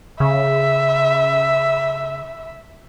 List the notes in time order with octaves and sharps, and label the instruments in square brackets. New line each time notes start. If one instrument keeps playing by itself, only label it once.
[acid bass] C#3 [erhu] E5